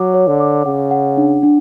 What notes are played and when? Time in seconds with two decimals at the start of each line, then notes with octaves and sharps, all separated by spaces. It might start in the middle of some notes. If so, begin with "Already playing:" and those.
Already playing: F#3 C#5 D6
0.14 C#5
0.28 D3
0.40 D6
0.65 C#3 F#5
0.91 F#5
1.17 D4
1.43 D4